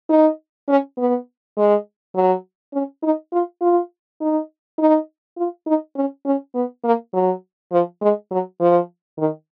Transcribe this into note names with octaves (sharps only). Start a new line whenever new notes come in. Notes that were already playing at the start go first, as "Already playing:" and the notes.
D#4
C#4
B3
G#3
F#3
C#4
D#4
F4
F4
D#4
D#4
F4
D#4
C#4
C#4
B3
A#3
F#3
F3
G#3
F#3
F3
D#3